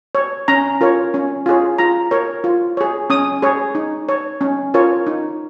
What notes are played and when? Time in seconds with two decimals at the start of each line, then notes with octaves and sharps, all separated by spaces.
0.15 C#5
0.48 C#4 A#5
0.81 F4 A#4 C#5
1.14 C#4
1.46 F4 G#4 C#5
1.78 F4 A#5
2.11 A#4 C#5
2.44 F4
2.77 G#4 C#5
3.10 C#4 D#6
3.42 G#4 C#5
3.75 D#4
4.09 C#5
4.41 C#4
4.74 F4 A#4 C#5
5.07 D#4